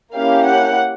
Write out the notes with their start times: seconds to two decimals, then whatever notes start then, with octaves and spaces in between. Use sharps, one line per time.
0.13 A#3 C#4 E4 G4 F5
0.44 F#5